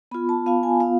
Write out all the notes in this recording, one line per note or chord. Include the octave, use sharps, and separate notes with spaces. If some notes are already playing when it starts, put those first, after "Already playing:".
B3 F4 B5
A5
B3 F4 F5
G#5
B3 F4 F5